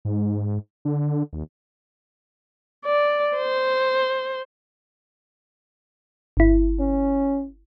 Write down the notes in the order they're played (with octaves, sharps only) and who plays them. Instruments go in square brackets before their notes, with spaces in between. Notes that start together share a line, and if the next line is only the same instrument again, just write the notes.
[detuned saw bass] G#2
D3
D#2
[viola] D5
C5
[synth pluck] G1 E4
[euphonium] C#4